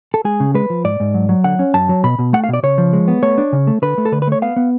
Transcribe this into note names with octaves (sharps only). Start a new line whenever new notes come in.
A4
G#3 G#4
C#3
G#3 B4
F3
G#2 D5
G#2
F#3
F#3
D3 F#5
C#4
F#2 A5
F#3
B2 B5
B2
A3 F#5
F5
B2
D5
C#3 C#5
F3
G#3
B3
A3 C#5
D4
C#3
A3
D3 B4
A3
A4
D3 B4
B4
A3 C#5
B3 F5
B3